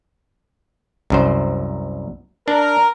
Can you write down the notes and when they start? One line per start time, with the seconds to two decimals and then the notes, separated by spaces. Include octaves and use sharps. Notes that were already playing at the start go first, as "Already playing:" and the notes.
1.10 C2 F#2 C5
2.48 D4 A#4